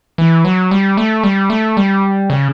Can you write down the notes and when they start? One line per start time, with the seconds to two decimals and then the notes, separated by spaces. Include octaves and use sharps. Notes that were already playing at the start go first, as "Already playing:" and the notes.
0.18 E3
0.45 F#3
0.71 G3
0.97 A3
1.23 G3
1.50 A3
1.77 G3
2.30 C#3